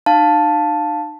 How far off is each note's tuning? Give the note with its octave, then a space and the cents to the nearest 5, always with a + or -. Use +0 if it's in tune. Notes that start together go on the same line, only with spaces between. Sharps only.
D#4 -40 F5 +10 A5 +0